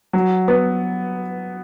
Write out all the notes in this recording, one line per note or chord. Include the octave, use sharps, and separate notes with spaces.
F#3
B3